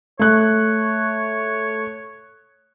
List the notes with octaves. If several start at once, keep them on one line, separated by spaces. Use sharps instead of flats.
A3 C#5 F#6